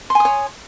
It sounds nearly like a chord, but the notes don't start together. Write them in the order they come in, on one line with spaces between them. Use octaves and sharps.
C6 G#5 D#6 C#5